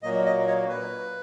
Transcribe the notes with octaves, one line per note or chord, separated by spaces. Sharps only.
A#2 F#3 A#3 D#5
D#5
C#5
B4